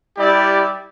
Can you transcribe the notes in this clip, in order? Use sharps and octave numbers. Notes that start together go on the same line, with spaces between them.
G3 E4 G4 D5